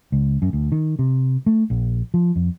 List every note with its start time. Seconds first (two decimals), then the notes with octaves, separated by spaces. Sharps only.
0.12 C#2
0.42 F#2
0.53 D2
0.72 D#3
0.99 C3
1.46 A3
1.70 A#1
2.14 F3
2.36 F2